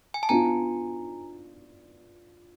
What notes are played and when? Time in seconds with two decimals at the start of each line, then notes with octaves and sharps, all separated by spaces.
0.14 G#5
0.23 A5
0.29 B3 D4 F4 G#5 A#5